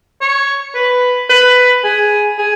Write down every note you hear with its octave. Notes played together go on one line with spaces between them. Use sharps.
C#5
B4
B4
G#4
G#4